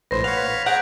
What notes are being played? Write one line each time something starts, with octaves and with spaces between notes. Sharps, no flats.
A#1 A2 B4 C5 A#6
B3 C#5 F5 F7
B6
G#4 F#5 A#5 F#6 G6 D7